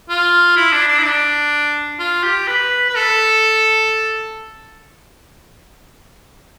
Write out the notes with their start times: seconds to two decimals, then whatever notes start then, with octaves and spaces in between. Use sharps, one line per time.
0.09 F4
0.56 E4
0.72 D4
0.88 D4
0.99 E4
1.04 D4
1.99 F4
2.24 G4
2.47 B4
2.89 B4
2.96 A4